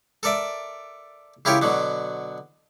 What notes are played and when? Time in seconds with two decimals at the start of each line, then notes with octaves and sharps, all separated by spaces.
0.23 A4 A#4 D5 E5
1.45 C#3 E4 F4 G4 A#4 C#5
1.62 B2 D3 F#3